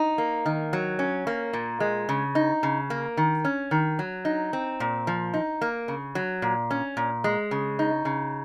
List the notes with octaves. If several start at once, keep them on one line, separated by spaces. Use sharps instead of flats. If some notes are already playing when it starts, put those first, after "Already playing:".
Already playing: D#4
A#3
D#3
F#3
C#4
A#3
A#2
G#3
C#3
D#4
C#3
A#3
D#3
C#4
D#3
F#3
D#4
C4
A#2
F3
D#4
A#3
C#3
F#3
A#2
C#4
A#2
G#3
C#3
D#4
C#3